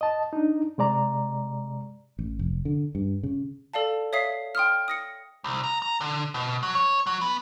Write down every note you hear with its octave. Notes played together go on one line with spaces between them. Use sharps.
D#5 A5
D4 D#4
C3 G#3 D5 A#5
A1
F1
D3
G2
C#3
A4 D5 F5 A5
C#5 E5 F5 D#6 B6 C7
G5 C6 D#6 F6
D#6 A#6 C#7
C2
A#5
A#5
D3
B2
F#3
C#5
F#3
B3